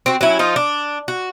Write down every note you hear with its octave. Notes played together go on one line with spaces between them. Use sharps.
C4 F#4
F#3 C#4 E4
F3 D#4 F4
D4
F#4